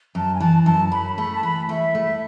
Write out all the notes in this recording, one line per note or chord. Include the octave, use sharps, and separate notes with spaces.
F#2 A5
G#5
E3 A5
F#2 A5
F#2 B5
A3 B5
A5
E3 B5
A3 E5
A3